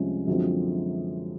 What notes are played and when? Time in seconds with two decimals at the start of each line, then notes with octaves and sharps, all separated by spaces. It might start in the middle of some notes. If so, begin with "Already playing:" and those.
Already playing: C2 C3 F3 G#3 C#4
0.27 F#2 D3 F3 G#3 C4